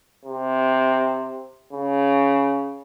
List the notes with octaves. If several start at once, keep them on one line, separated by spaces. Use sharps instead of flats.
C3
C#3